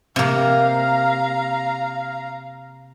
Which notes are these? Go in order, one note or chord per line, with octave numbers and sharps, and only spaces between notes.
C3 A#3 F5 A#5